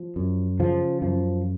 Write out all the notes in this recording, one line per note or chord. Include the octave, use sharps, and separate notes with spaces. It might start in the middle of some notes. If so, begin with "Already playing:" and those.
Already playing: F3
F#2
C#3 F3
F#2 F3